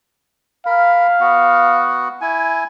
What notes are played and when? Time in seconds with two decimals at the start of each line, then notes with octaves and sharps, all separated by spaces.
0.66 A#4 F5 B5
1.20 B3 F#4 F#5
2.21 E4 G#5